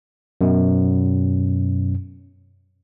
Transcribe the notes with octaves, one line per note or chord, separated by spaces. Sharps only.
F#2 B2